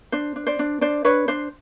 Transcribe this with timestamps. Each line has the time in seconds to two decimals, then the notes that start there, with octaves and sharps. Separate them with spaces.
0.12 D4 C5
0.36 D4
0.47 C5 D5
0.59 D4
0.81 D4 C5 D5
1.05 D4 B4 C#5
1.28 D4 C5